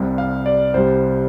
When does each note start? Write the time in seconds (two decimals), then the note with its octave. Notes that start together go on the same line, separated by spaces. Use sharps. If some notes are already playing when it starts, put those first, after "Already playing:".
Already playing: C2 C3 G3
0.18 F5
0.46 D5
0.74 C2 C3 G3 C5